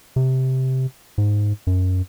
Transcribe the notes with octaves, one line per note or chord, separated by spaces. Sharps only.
C3
G#2
F#2